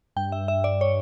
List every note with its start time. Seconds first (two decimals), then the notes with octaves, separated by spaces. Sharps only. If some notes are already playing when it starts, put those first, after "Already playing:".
0.16 G2 G5
0.32 E5
0.48 E5
0.64 D5
0.81 C#5